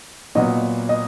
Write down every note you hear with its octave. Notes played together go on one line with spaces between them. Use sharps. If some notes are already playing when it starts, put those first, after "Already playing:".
A#2 F#3 B3 D#5
D#5